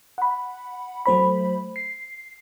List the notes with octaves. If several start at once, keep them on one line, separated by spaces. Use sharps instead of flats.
F#5 B5
F#3 A3 C5 B5
C7